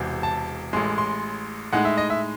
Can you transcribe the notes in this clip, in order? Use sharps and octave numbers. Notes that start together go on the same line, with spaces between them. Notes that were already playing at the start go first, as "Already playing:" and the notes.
Already playing: E1 E2 C3
A5
A1 A2 G#3 C6
C6
A2 G#3 D#4 F#5
E5
D#5
E5